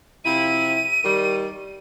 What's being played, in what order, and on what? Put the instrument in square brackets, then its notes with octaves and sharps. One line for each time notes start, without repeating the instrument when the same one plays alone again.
[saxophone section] C3 F3 E4 [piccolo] D#7
[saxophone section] D#3 G3